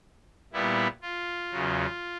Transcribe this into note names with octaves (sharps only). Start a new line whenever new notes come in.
A#2 G3 B3 E4
F4
E2 C#3 F#3